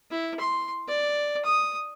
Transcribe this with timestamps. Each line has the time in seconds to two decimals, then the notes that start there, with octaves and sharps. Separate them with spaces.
0.11 E4
0.40 C6
0.88 D5
1.45 D#6